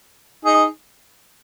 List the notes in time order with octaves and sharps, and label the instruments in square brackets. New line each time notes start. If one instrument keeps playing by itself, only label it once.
[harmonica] D#4 G#4